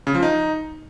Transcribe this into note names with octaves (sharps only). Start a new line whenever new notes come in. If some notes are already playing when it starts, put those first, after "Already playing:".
C#3
F3
D#4